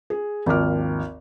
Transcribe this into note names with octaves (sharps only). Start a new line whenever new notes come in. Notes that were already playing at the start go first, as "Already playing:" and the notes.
G#4
G#1 D#2 F3 D6 F6